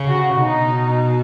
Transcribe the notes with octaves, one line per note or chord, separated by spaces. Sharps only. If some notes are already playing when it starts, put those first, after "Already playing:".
Already playing: C#3
F#4
B2 D#4